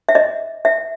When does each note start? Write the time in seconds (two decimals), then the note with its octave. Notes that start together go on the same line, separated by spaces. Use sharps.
0.09 E5
0.15 D#5
0.65 E5